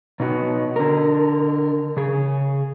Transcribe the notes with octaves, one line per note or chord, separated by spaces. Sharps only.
B2 D#4 E4 F#4
D3 A#4
C#3 G#4